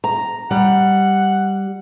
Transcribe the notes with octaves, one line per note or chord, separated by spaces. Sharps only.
A#5
G3 F#5